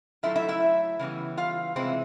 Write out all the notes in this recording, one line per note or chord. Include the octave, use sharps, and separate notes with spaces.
A2 F#3 A3 D4 E4 F4 E5
E4 E5
E4 E5
C#3 E3 G3 B3
F4 F5
C3 E3 G#3 C4 E4 C5